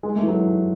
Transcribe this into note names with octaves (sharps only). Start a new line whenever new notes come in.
G#3
A3
E3
F#3